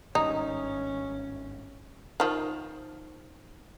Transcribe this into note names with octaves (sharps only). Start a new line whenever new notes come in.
G#1 G2 D#3 C#4 D#4
D#3 F3